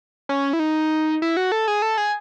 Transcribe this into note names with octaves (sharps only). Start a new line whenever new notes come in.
C#4
E4
D#4
E4
F#4
A4
G#4
A4
G#4